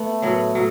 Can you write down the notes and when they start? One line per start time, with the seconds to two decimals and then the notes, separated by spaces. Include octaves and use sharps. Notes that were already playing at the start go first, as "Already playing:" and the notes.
Already playing: A3 B3
0.22 A2 F#3 B3
0.55 A2 F#3